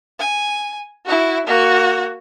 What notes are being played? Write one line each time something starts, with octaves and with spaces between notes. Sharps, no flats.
G#5
E4 F#4
A#3 F#4